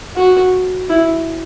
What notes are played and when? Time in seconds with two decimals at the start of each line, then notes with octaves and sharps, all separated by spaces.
0.17 F#4
0.90 E4